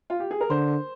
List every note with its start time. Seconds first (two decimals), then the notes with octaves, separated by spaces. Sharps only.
0.10 F4
0.20 G4
0.31 G#4
0.41 A#4
0.50 D3 C5